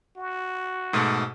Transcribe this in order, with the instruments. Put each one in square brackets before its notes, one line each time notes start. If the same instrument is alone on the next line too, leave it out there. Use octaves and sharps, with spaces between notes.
[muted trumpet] F#4
[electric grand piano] G#2 B2 A3